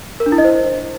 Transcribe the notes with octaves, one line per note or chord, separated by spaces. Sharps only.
A#4
D4
E4
D#5
C5